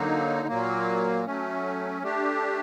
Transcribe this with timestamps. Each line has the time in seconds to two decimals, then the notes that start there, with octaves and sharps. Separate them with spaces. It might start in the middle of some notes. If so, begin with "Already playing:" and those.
Already playing: D3 F#3 A#3 D#4
0.48 A#2 F#3 A#3
1.26 F#3 A3 C#4
2.02 A3 D4 G4